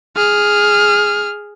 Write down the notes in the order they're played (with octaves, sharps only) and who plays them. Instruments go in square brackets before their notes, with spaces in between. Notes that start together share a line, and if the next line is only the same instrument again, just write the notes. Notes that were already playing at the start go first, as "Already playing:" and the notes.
[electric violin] G#4 F6